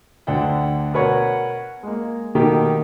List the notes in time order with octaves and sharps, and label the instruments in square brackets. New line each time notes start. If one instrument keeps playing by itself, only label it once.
[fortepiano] D2 D3 D4 F#5 G5
B2 A#4 B4 C#5 F#5 C#6
G#3 A#3
B2 D#3 A3 A#3 G4 A#4